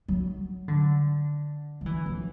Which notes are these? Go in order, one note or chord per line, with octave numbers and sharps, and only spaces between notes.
F#3
D3
F#3
E3
F#3